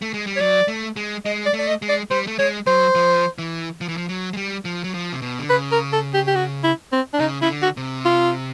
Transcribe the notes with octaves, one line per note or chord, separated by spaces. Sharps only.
A3
G#3
G3
C#5
F#3 D5
A3
G#3
G#3 D#5
D5
A3
D5
D#5
G#3
D5
G3 C5
A3
G#3 C#5
F#3 C5
F3
E3
F3
E3
F3
F#3
G#3
G3
F3
F#3
F3
C3
B2
D3
C#3 B4
A#4
A4
G4
G4
F#4
E4
C4
D4
C#3 D#4
C#3 E4
D3
F#4
C3
F4